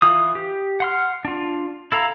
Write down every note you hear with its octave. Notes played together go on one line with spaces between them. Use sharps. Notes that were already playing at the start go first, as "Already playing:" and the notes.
E3 F4 D#6
G4
F#5 C6 F6
D4 F4
E4 A4 F5 A#5